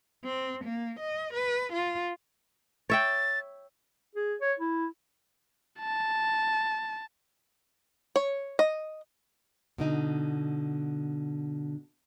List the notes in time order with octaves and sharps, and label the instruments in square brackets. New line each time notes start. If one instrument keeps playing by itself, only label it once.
[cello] C4
A#3
D#5
B4
F4
[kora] C#5 E5 G5 [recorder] A6
[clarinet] G#4
C#5
E4
[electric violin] A5
[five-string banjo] C#5
D#5
[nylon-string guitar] B2 D3 D#4